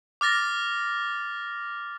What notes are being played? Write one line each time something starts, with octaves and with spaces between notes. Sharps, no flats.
D6 F6 A6 A#6